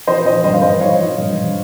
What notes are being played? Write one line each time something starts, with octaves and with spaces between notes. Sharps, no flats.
F3 C5 D#5
F3 C5 D#5
G2 C5 D#5
F5
G2 C5 D#5
F3 C#5 F5
F3
G2
G2